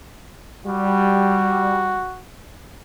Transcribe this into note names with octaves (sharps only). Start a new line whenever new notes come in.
G3 F#4